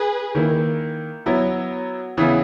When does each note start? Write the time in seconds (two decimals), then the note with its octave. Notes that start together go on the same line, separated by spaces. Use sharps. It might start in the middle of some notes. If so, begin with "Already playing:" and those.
Already playing: G#4 B4
0.35 D#3 A#3 E4
1.26 F#3 B3 E4
2.17 C#3 E3 B3 E4